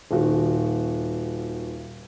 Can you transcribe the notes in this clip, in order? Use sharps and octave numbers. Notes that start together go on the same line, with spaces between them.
D#1 F#4